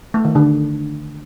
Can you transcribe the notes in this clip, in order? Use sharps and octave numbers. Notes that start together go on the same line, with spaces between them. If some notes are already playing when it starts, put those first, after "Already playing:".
A3
D#3
D3